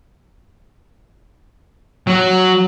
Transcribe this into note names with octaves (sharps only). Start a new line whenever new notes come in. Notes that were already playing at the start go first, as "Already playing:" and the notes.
F#3